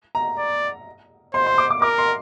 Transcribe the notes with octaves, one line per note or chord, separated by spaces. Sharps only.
A#5
D5
C5 C6
C6
D6
D6
A#4 D6
C6